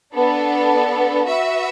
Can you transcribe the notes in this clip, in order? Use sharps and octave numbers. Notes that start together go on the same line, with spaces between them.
B3 D4 A4
F#4 B4 E5